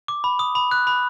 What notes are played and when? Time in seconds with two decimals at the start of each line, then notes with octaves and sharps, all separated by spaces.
0.08 D6
0.24 B5
0.39 D#6
0.55 B5
0.71 F#6
0.87 B5